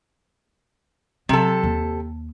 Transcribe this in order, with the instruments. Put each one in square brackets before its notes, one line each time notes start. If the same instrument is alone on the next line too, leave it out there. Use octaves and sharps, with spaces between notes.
[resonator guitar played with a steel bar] C3 A4 [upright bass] F#3
[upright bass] D#2